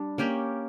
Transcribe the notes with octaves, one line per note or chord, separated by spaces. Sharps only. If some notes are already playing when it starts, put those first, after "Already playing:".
Already playing: G3 D4
A#3 C#4 G4 A#4